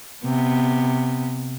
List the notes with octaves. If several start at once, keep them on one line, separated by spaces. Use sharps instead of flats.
C3 B3